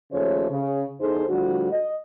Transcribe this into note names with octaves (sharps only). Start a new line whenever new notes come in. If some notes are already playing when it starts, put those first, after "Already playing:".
D#2 C#3 F3 A3 C5 C#5
C#3
E2 D#4 G#4 A4 C5
A2 D3 F3 G3 F#4
D#5